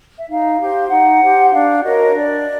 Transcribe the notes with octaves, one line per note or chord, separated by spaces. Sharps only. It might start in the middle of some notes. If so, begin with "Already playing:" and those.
E5
D#4 F5
G4 C5
D#4 F#5
G4 C5
D4 F5
F#4 A#4 C#5 D#5
C#5
D4 D5